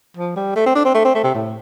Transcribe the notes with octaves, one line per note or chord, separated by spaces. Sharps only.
F3
G3
A3
C4
D4
C4
A3
C4
A3
C3
A2